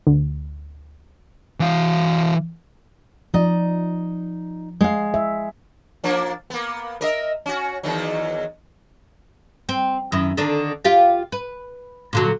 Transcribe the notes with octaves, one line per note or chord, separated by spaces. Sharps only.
D2
E3 F5
F3 D#4 D5 D#5
G#3 F5
E5
F3 A#3 D4
A#3 B3
A#4 D#5 E5
C#4 F#4
E2 D#3 F#3
C4
F#2 D#3 E4
D3 D#3 D4
F4 G4 F5
B4
A#2 D3 F#3